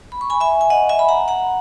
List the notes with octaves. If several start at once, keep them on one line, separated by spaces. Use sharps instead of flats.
B5
C#6
G#5 B5
E5 G#5
G#5
D#5 F#5
E5 G#5
B5
F#5 A#5
F#5 A#5